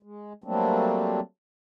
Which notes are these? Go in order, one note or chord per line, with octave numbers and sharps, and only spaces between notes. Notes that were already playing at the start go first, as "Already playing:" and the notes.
G#3
F#3 G3 A3 A#3 C4 D4